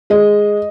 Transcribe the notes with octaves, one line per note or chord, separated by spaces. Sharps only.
G#3 D#5